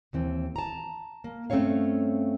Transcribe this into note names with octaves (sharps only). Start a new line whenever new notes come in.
D#2 E3 C4
A5 A#5
A#3
G2 A3 C4 C#4 C#5 F5